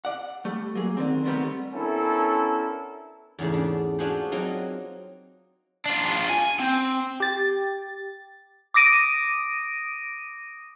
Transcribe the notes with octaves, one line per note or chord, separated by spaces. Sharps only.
D5 F#5
G3 A3
F#3 A#3 G#4
D3 D#3 C4
D#3 E3 G3 A3 B3 C4
B3 C#4 D4 E4 A4 A#4
E2 G#2 C#3 A3
D4
D4 F4 F#4 G#4 A4 C5
F#3 A#3 C4 D#4 F4
D4 F4
G#5
C4
G4 A6
D6 D#6 A#6 D7 D#7